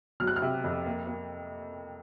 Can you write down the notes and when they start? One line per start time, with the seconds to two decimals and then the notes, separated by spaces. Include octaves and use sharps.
0.20 F#3 F6
0.27 F#6
0.36 F6
0.42 C3
0.64 F2
0.86 A#3
1.07 A#3